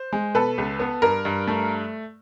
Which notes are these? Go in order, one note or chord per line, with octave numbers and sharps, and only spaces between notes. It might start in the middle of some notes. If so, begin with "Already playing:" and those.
Already playing: C5
G#3
B2 A4 B4
C#2
B3
G2 A#4
G2
A3